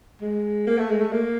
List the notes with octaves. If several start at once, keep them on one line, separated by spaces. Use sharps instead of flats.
G#3
A#3
A3
G#3
A3
A#3